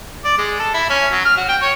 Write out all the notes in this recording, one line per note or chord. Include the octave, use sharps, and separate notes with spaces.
D5
G#3
A4
E4
C#4
F#3
F6
F#4
G5
C#5